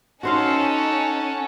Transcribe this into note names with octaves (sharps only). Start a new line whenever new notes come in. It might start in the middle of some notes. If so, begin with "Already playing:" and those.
C#4 D#4 F#4 A4 C5 F5 F#5